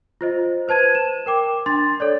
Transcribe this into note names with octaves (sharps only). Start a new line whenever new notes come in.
F4 C5 D#5
B4 C5 A5 G#6 D#7
E7
A#4 G5 D6
D4 C6 A6
A4 C#5 D5